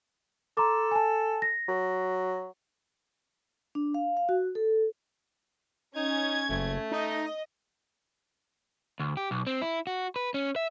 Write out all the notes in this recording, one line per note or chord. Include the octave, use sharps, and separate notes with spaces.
A4 A#5 C6 D6
G#5 A5
A#6
F#3
D4
F5
F5
F#4
A4
C#4 D#4 G#6
F#1 A3
D#4 D#5
D2
G4
B1
C4
E4
F#4
B4
C#4
E5